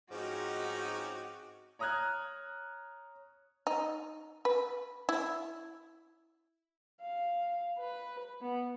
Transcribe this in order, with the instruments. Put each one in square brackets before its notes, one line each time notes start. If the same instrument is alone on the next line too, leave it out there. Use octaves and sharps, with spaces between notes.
[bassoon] G#2 [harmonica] F3 C#4 D#4 [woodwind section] C4 G#4 D6 [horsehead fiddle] F#4
[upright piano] C#5 A#5 D#6 F6 F#6 G#6
[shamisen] D#4
B4
E4
[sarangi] F5
B4
B3